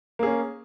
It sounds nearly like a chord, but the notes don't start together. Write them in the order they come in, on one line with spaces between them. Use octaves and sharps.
A#3 G#4 C#4